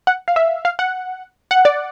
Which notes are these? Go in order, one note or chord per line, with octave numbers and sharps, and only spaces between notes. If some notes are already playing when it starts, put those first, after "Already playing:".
F#5
F5
E5
F5
F#5
F#5
D5